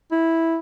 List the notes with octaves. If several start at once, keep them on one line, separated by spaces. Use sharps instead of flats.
E4